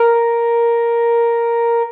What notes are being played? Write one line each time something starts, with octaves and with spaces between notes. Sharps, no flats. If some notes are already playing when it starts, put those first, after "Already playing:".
Already playing: A#4